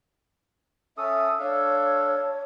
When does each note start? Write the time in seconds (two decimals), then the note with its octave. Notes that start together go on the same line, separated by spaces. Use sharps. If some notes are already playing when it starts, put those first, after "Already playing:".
0.97 C#4 A4 E5 D#6
1.39 D4 A4 C#5 F5